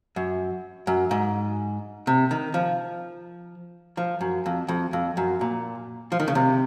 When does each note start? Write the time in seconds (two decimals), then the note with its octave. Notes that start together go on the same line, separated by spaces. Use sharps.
0.16 F#2
0.87 F#2
1.11 G#2
2.07 C3
2.31 D#3
2.54 F3
3.97 F3
4.21 F#2
4.46 F2
4.68 F2
4.93 F2
5.17 F#2
5.41 A#2
6.12 F3
6.20 D#3
6.28 C#3
6.35 C3